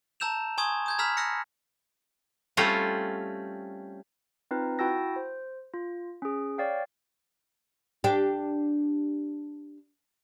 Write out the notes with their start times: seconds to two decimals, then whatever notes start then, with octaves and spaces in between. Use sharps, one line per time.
0.20 A5 A#5 E6 G6 E7 F7
0.58 G#5 C6 C#6 D#6 G#6
0.86 D#6 G6 G#6
0.99 A#5 B5 E6 F6 G#6 B6
1.17 E6 F#6 A#6 C#7
2.57 G3 A3 C4 C#4 F4
4.51 C4 D#4 F4 B4
4.79 E4 F#4 G5 A5 E6 A#6
5.16 C5
5.74 F4
6.22 C#4 G#4
6.58 C#5 D5 F5 G5
8.04 D4 G4